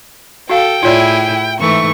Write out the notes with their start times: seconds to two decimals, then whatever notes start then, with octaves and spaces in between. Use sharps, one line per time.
0.50 F#4 A4 F5 G5
0.83 A2 E4 F4 G#4 C#5 D5
1.60 G#2 E3 A3 C#6